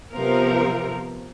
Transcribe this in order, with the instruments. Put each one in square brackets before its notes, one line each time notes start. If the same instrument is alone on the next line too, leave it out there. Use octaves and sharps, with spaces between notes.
[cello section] C3 F3 B3 A#4